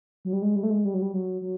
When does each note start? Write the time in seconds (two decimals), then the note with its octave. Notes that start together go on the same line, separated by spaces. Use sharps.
0.25 F#3
0.33 G3
0.42 G#3
0.56 G3
0.63 A3
0.70 G#3
0.85 G3
0.94 F#3
1.02 G3
1.14 F#3
1.41 F#3